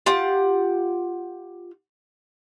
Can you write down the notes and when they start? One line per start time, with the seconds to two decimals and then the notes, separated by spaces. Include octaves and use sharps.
0.06 F4 G4 F#5